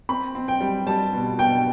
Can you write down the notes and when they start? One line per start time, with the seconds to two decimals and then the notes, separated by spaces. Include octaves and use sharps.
0.09 C4 B5
0.35 C4
0.48 G5
0.61 G3
0.87 G3 A5
1.13 B2
1.38 B2 G5